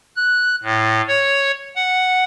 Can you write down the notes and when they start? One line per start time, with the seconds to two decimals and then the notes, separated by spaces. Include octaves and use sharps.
0.16 F#6
0.63 A2
1.08 C#5
1.76 F#5